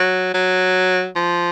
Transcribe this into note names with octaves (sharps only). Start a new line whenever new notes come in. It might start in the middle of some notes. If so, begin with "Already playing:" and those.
Already playing: F#3
F#3
F3